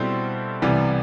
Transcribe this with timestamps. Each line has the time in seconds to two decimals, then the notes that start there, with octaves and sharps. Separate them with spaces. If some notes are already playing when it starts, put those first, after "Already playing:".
Already playing: B2 G3 C4 E4 A4
0.62 C2 C3 E3 G3 B3